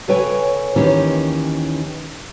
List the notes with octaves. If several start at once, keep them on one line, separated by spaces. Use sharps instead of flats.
C#3 A4 B4 C#5 G5 G#5
D#2 D#3 E3 C#4 G4